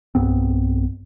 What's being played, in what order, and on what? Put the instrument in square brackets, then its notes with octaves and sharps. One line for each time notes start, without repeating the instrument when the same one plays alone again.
[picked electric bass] B1 G2 B3 C4